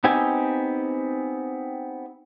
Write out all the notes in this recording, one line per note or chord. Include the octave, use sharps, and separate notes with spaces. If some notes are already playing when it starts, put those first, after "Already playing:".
B3 C4 D#4 G4 G#5